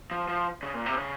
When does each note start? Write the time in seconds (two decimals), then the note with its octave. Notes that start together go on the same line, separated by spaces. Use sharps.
0.11 F3
0.28 F3
0.63 C#3
0.74 A#2
0.86 C3
0.97 C#3